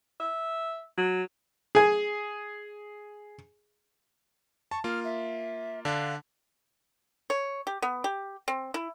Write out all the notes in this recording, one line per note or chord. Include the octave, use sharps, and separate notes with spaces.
E5
F#3
G#4 G#5
A5 C#6
A#3 F4 F6
E5
D3 D4 F5
C#5
G4
B3
G4
C4
E4